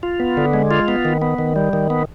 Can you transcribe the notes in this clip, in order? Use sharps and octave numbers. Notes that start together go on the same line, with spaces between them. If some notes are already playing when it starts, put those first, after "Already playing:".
F4
B3
D3
G#3
F4
B3
D#3
B3
D#3
G3
D#3
B3